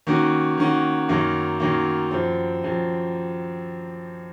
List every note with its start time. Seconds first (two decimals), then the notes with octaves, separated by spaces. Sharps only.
0.07 D#3 A#3 C#4 F#4
0.58 D#3 A#3 C#4 F#4
1.09 F#2 D#3 F#3 A#3
1.60 F#2 D#3 F#3 A#3
2.11 F#2 F3 C4
2.63 F#2 F3 C4